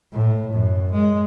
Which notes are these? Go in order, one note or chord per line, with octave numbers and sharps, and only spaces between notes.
A2
F#2
G#3